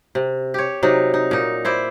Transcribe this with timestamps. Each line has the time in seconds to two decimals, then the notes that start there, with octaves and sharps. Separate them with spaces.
0.15 C3
0.54 G4 C#5
0.83 C3 F#3 D#4
1.14 D#4
1.31 A#2 D#4
1.65 E4 C5 D5